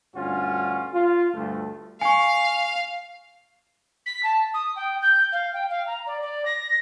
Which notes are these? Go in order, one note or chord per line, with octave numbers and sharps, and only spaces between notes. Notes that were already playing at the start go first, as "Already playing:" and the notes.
D2 G2 C#4 F4 F#4
F4
D2 G2 A3
F5 G#5 C#6
B6
A5
D#6
G5
G6
F5
G5
F5
A#5
D5
D5
A#6